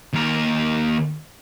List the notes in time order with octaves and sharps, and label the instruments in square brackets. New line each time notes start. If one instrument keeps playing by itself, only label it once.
[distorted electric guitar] D#2 A#4